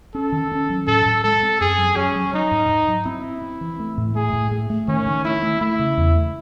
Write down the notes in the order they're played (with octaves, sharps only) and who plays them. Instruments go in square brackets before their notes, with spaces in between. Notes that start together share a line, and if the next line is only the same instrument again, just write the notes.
[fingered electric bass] C#4 [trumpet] A4
[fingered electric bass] D#3
C#4
F#3
[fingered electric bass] A2 [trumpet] A4
[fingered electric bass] A2
[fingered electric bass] G#3 [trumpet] A4
[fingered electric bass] C4
[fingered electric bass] F#2 [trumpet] G#4
[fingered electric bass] F#3
[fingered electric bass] F#3 [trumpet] C#4
[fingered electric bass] F#3
[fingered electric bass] F#3 [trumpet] D#4
[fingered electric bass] G#2
G#2
F#3
[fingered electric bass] C4 [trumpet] E4
[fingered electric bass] C4
C4
E3
A3
A2
[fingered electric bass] A3 [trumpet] G#4
[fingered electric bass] A2
A3
A3
[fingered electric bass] D#3 [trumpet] C#4
[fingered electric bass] D#3
[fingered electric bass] A3 [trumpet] E4
[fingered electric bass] A3
[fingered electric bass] A3 [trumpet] E4
[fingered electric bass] C#3
E2
A3